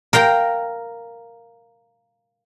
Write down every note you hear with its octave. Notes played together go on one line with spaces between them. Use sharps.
A#4 F5 G5 A#5